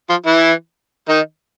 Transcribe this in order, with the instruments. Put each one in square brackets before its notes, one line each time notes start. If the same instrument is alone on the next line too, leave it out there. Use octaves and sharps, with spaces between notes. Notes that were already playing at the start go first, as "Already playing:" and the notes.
[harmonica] F3 F4
E3 E4
D#3 D#4